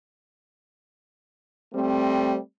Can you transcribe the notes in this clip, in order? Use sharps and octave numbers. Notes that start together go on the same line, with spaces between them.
G3 A3 C4